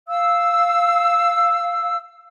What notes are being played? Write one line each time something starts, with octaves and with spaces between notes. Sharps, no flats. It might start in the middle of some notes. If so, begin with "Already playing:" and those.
F5 E6